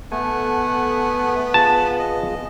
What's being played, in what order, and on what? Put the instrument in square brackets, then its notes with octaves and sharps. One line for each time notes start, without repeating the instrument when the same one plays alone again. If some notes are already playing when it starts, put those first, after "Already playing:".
[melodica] A3 [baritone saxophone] B3 [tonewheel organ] A4 F#5 G#5
[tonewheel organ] F4 G#4 [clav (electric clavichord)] A5
[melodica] D#5